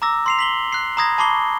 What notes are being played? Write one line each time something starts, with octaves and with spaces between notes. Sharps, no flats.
A#5 D6 E6 A#6
C6 C7 F7
B6 F#7 G7
F#6 C7
A#5 B5 D#6 G#6 A#6
A5 B5 C#6 D6 C7 G7